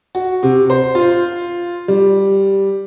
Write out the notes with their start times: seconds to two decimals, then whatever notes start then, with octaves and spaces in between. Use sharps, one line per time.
0.15 F#4
0.43 C3
0.70 C5
0.95 F4
1.88 G3